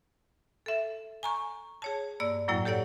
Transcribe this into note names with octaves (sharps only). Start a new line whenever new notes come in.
A4 E5
G#5 A#5 C#6
G#4 C#5 A5
G2 A#3 D5 E6
F#2 A2 F#3 A#3 E4 G5
G4 A4 C#5 D5 F#5